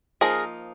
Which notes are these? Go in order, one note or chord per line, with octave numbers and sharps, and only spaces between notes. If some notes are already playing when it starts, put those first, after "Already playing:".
F3 A#3 D#4 G#4 A#4